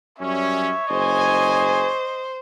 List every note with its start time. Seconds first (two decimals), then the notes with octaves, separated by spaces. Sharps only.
0.20 F#2 G3 C#4 C#5 E5
0.90 F#1 G#4 C5 D#5 G#5